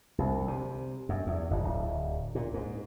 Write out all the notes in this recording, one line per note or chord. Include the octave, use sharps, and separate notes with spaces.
C2
C3
F#2
E2
G1
D1
A#2
G#2